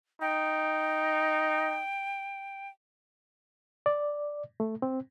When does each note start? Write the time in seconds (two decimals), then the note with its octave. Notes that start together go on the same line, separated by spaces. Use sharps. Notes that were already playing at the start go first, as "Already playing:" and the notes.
0.21 D#4 G5
3.86 D5
4.60 A3
4.82 C4